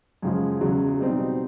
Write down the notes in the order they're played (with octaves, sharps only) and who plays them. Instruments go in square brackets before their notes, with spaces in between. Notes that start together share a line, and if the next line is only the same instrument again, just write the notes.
[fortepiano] F#2 C#3 F3 G#3
E2 C#3 F#3
B2 G3 C4 D#4